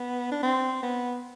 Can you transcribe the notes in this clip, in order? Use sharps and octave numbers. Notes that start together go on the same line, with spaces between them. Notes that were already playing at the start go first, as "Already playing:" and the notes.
Already playing: B3
D4
C4
B3